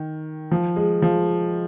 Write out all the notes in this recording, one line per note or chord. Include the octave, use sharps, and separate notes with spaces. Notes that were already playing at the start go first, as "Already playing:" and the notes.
Already playing: D#3
F3
G#3
F3